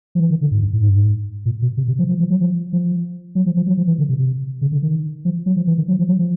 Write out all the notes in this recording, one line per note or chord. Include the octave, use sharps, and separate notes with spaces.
F3
E3
D#3
D3
G#2
G2
A2
G#2
G2
G#2
A#2
B2
C3
C3
F3
F3
F3
F#3
F3
F3
F#3
F3
F3
F#3
F3
E3
D3
C3
C3
C#3
D3
D#3
F3
F#3
F3
E3
D#3
F#3
F3
F#3
F3